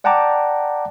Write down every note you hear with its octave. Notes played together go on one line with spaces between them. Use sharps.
D5 F#5 G5 A5 A#5 D6